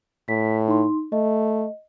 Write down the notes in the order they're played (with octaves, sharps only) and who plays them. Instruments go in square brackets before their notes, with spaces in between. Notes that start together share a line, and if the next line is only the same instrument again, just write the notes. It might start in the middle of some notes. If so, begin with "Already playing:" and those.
[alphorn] A2 [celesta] B6
[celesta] D#4 C6
[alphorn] A3 [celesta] D#5